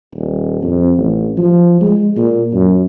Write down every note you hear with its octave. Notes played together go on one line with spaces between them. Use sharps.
D#1
F2
A1
F3
G#3
A#2
F#2